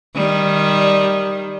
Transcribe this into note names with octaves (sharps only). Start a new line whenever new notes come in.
D#3 G3